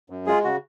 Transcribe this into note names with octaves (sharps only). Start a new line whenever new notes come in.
F#2
G#3 F4 G#4
C#3 F#4